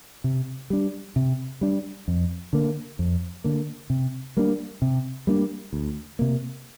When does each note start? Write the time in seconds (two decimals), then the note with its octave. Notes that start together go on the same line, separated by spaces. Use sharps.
0.24 C3
0.70 G3 D4
1.16 C3
1.61 G3 D4
2.08 F2
2.53 D3 A#3
2.99 F2
3.44 D3 A#3
3.90 C3
4.37 G3 A#3 D4
4.82 C3
5.27 G3 A#3 D4
5.73 D2
6.19 C3 A#3